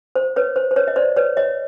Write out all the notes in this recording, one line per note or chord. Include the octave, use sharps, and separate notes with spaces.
C5
B4 C#5
C5
C5
B4 C#5
D#5
C5 D5
B4 C#5
C#5 D#5